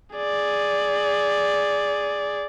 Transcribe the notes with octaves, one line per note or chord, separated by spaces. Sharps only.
G#4 D5